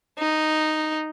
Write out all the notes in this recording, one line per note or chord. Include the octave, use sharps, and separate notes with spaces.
D#4